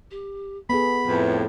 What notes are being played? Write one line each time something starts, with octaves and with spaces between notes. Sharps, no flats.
G4
B3 G#4 A4 B5
F2 A2 B4